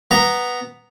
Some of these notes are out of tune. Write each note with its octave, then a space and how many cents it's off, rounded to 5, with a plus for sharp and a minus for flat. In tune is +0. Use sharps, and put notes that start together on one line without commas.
B3 +0 A#5 +0